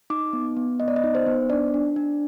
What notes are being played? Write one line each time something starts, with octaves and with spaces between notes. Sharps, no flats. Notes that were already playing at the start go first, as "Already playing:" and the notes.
D#4 D6
B3
B3
B3 D#5
D5
D#5
D#4
C5
B3
D4 D5
D4
D4